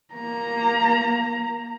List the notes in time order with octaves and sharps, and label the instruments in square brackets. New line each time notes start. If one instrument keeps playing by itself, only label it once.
[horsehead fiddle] A#3 A#5